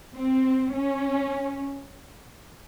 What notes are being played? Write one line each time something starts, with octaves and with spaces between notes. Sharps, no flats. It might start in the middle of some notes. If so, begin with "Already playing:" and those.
C4
C#4